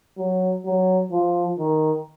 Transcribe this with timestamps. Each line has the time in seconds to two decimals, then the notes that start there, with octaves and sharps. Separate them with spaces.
0.18 F#3
0.65 F#3
1.12 F3
1.59 D#3